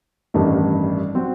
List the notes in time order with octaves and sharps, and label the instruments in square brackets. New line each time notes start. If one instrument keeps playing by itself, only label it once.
[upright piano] A1 G2 D#3 A3
F#3 C4 F#4